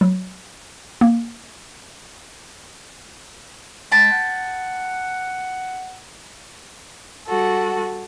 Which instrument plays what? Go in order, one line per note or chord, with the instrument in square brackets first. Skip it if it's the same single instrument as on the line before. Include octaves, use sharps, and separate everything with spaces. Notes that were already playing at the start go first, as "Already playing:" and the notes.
[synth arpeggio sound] F#3
A#3
[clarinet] G#3 [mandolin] G5 A5 B5
[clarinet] F#5
[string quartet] G3 F#4 A4